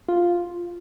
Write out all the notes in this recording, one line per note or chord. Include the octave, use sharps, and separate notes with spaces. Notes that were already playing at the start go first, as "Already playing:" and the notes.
F4